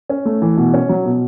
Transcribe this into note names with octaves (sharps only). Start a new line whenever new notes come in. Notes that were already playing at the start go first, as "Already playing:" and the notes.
C#4
A3
E3
B2
C#4
F#3
B2